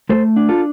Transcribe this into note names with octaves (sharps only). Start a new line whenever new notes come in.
A3 A4 C5
D4
F4 A4